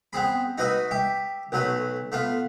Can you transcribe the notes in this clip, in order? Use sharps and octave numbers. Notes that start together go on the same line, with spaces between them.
B3 C4 G#4 B5
D#4 F#4 B4 D#5 E5
G4 E5
B1 F#3 A3 B4
A3 B3 F4